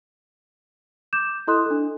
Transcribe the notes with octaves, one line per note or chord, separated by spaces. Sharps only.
D6 G6 E7
E4 A4 D#5 C6 D#6 F#6
D4 A4